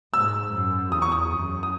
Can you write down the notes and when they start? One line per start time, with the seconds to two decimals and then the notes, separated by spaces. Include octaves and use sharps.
0.13 G#2 E6
0.53 F#2
0.92 E2 D#6
1.02 C#6
1.12 D#6
1.32 F#2
1.63 D#6